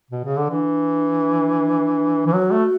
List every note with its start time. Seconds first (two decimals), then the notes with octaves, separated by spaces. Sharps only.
0.11 B2
0.24 C#3
0.37 D3
0.50 E3 D4
2.26 E3
2.33 F#3 F#4
2.52 A3